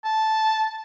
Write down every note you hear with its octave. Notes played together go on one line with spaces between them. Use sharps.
A5